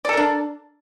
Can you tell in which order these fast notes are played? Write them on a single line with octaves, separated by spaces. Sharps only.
D5 A4 A#4 D4